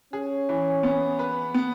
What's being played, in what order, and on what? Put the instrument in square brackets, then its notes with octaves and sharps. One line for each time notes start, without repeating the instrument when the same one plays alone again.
[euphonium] C#4 [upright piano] G#4
[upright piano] E3
B3
B4
B3